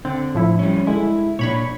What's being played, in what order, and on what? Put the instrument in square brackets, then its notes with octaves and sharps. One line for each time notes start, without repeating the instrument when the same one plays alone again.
[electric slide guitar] D3 [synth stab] C4
[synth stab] A2 F3 E4
[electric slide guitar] G3 C#4
[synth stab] D3 G#3 [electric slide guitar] E4
[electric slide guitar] A#2 D4 [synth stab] C#5 B5 C#6